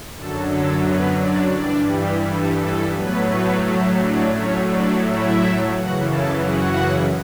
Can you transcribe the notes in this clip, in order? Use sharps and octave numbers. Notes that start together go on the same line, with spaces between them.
F#2 D3 F#3 A4
A4
B3 B4
D4 D5
G2 E3 G3 D4 D5
G4
A4
A4
A2 F#3 A3 B3 B4
B3 B4
D4 D5
A2 F#3 A3 C#4 C#5
D4 D5
E4 E5
F#2 C#3 E3 F#4 F#5
A4 A5
F#4 F#5